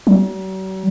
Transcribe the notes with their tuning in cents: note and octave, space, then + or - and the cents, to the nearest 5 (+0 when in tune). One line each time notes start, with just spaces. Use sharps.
F#3 +45